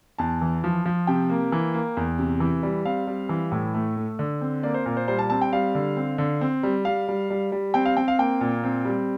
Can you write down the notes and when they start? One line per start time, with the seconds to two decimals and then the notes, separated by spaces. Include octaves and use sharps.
0.18 E2 A5
0.42 E3
0.64 F3
0.86 F3
1.07 C3 G5
1.30 A#3
1.52 E3
1.74 A#3
1.97 E2
2.19 C3
2.40 E3
2.63 G3
2.85 C4 F5
3.07 G3
3.29 E3
3.52 A2
3.74 A3
3.96 A3
4.19 D3
4.41 C4
4.63 A#3 D5
4.74 C5
4.86 A#2 A#4
4.97 C5
5.08 G3 C5
5.19 A5
5.30 C4 A5
5.41 G5
5.53 G3 F5
5.75 D3
5.97 C4
6.18 D3
6.41 C4
6.63 G3
6.85 G3 F5
7.08 G3
7.30 G3
7.52 G3
7.74 C4 G5
7.85 F5
7.97 C4 G5
8.08 F5
8.19 A#3 G5
8.41 A#2
8.64 C4
8.85 G3